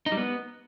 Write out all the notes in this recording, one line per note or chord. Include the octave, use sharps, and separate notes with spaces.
D#4
G3
B3